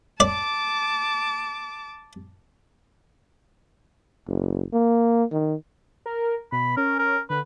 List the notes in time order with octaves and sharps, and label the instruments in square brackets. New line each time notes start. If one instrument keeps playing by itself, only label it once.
[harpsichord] D5 [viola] A5 D6
[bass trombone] F#1
A#3
D#3
[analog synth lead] A#4
[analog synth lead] B2 [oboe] B5
[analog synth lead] C#4 [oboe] A#4
[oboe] A#4
[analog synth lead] D3 [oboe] B4